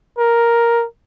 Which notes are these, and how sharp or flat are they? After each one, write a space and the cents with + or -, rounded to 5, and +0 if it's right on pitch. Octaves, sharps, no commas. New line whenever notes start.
A#4 +5